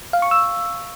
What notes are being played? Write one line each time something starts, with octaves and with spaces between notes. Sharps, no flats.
F5
C#6
E6